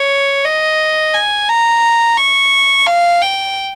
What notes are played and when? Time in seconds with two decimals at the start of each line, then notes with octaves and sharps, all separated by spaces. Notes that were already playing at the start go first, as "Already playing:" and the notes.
Already playing: C#5
0.44 D#5
1.14 G#5
1.49 A#5
2.17 C#6
2.86 F5
3.22 G5